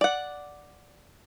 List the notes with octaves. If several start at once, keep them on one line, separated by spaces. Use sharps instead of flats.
D5 F#5